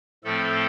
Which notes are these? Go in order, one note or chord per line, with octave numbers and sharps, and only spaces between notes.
A2 F3 A3 C4 A4